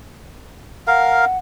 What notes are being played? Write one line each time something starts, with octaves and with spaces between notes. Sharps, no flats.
A#4 F5 F#5